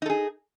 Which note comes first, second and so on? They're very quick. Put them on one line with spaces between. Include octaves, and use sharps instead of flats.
D#4 A4 G#4